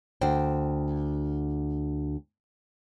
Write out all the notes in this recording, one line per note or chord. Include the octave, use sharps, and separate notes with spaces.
D2 C5 G5